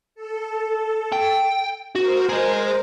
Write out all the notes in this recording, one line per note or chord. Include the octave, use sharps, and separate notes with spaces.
A4
G5
F#4 A#4 C5
G#4 D#5